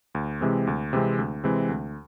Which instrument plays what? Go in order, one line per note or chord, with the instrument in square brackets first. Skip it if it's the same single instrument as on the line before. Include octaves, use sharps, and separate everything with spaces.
[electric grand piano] D2
C3 E3 G#3 C4
D2
C3 E3 G#3 C4
D2
C3 E3 G#3 C4
D2